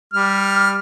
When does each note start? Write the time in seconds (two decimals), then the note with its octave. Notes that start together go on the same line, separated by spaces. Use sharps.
0.13 G3 F6